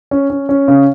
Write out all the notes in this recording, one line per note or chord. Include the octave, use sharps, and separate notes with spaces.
C#4
C#4
C#4
C#3